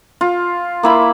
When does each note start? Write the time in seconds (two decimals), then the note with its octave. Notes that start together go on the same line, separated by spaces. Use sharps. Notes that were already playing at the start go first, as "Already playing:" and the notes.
0.21 F4
0.83 A#3 E4 B5